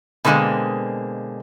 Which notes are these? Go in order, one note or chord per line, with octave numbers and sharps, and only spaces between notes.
B2 D3 F#3 G#3 A#3 C4